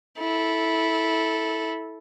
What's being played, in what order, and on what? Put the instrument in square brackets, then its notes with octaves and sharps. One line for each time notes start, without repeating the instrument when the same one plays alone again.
[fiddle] E4 A4